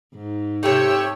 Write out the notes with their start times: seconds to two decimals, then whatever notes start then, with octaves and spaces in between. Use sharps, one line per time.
0.14 G#2
0.63 C3 A3 G4 C#5 E6